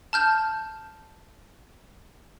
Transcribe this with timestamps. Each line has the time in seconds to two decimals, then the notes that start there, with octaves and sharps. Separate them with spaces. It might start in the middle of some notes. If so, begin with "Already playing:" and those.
0.13 A5 F6 G6